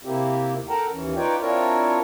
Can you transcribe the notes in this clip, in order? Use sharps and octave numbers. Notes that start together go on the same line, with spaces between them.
C3 A#3 C4 E4 G4
D#2
A4 A#4 F#5 G5 A5 A#5
D#2 E3 C#4
D#4 F4 B4 C#5 D5 G5
C4 D4 E4 F4 A#4 C#5